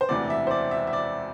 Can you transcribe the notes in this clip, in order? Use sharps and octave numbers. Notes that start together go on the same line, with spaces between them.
C5
E1 D2 C3 E3 D5
E5
C5
D5
E5
E5
D5